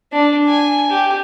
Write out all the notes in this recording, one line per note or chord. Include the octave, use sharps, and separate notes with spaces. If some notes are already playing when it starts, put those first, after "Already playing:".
D4
G#5
G4